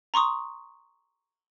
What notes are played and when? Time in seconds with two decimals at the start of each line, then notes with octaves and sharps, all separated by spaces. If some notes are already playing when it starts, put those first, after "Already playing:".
0.14 A#5 C6 C#6 D#6